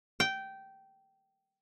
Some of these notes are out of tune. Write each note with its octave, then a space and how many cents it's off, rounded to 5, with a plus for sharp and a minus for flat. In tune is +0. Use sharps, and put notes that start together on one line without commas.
G5 -15